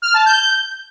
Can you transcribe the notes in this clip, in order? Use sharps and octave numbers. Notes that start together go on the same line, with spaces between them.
F6
A5
G6